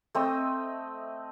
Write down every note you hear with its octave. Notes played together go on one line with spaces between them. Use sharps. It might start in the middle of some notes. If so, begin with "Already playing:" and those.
A3 C4 D#5